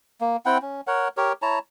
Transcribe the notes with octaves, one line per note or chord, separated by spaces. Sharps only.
A#3
C4 E4 F#5 G5
C#4
A#4 C#5 F#5
G4 A#4 C#5
E4 C#5 A5 A#5